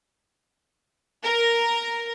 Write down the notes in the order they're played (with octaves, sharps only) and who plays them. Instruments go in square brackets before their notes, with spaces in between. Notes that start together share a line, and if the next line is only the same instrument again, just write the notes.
[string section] A#4